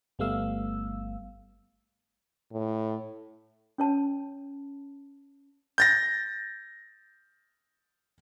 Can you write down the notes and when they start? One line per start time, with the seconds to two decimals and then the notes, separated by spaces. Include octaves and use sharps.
0.19 G1 G3 A3 B3 F5 E6
2.52 A2
3.78 C#4 C#5 A5
5.78 G6 A6 A#6